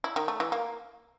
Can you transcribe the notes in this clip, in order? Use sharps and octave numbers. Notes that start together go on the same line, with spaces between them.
E4
D#3
A3
E3
A#3